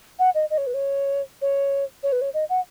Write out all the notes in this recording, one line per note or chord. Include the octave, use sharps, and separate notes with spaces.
F#5
D#5
D#5
C#5
B4
C#5
C#5
C#5
B4
C#5
D#5
F#5